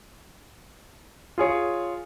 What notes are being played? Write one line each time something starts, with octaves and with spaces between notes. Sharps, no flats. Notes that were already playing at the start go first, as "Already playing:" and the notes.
F4 G#4 C#5